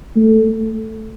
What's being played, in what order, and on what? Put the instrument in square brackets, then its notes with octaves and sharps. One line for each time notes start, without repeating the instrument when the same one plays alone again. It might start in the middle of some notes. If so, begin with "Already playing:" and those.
[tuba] A3